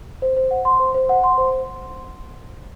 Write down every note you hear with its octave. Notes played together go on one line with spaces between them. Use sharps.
C5
C5
F#5
C6
C5
C5
F#5
C6
C5